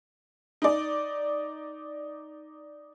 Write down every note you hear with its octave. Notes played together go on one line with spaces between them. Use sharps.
D#4 D5